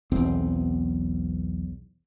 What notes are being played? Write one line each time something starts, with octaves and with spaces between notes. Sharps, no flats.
B1 E2 C4